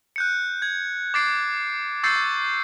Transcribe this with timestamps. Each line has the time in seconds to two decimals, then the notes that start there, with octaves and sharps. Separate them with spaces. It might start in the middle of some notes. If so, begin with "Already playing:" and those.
0.16 F#6 G6 C#7
0.62 G#6
1.14 D6 A6 C7 D7
2.03 C#6 E6 G6 A6 C7 C#7